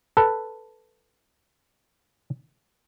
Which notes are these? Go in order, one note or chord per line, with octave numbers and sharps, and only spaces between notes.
A4 B4